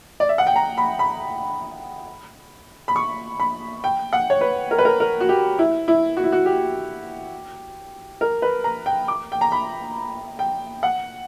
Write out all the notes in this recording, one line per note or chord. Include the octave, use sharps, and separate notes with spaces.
D5
E5
F#5
G5
A#5
B5
B5
B5
C#6
B5
G5
F#5
C#5
B4
A#4
B4
A#4
A#4
F#4
G4
E4
E4
F#4
E4
F#4
G4
A#4
B4
A#5
G5
D6
G5
A#5
B5
G5
F#5